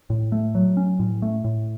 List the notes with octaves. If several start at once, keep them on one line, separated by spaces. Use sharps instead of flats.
A2
A3
F#3
C#4
A2
A3
A2